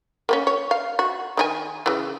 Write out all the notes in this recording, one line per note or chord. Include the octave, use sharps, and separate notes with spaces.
A#3 B3 C#4
C#5
F5
F#4
D#3 D#4 G#5
C#3 E3